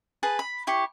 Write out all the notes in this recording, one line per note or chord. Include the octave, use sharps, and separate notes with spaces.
G#4 B4 A5
B5
E4 G4 C#6